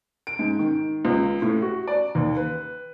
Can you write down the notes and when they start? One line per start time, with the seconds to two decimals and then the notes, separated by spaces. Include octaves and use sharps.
0.27 D7
0.39 G#2
0.59 D#3
1.05 C#2
1.42 A2
1.62 F#4
1.87 D5
2.15 D#2
2.37 B4